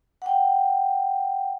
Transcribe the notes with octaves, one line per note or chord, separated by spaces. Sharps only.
F#5 G5